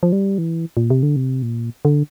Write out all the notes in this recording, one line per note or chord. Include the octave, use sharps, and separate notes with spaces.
F3
G3
E3
A#2
C3
D3
C3
A#2
D3